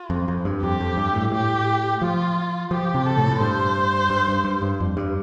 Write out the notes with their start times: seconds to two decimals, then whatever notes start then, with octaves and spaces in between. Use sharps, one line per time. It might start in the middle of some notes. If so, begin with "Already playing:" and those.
Already playing: F4
0.10 F2
0.28 F2
0.45 G2
0.62 F2 G4
0.80 F2
0.97 G2
1.15 A2
1.32 A2 G4
2.02 F3 F4
2.71 F3 G4
2.94 C3
3.06 A4
3.17 A2
3.32 A2
3.40 G2 C5
4.10 G2
4.28 G2
4.44 G2
4.62 G2
4.80 F2
4.97 G2